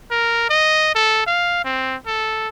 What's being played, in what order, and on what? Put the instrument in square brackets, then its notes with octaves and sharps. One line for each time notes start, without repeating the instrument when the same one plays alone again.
[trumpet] A#4
D#5
A4
F5
C4
A4